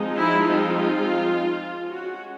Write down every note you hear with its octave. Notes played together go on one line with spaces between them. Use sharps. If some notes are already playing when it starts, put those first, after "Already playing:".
Already playing: F3 G#3 C4 D#4
E4
F4
G#3 C#4 F#4